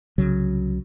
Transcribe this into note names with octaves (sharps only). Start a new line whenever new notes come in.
C2 C#3 F#3